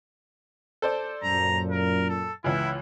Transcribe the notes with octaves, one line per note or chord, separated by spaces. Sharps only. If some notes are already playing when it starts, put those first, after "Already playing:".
A4 C5 D5
F#2 A#2 A#5
A#4
A4
C#2 E3 E4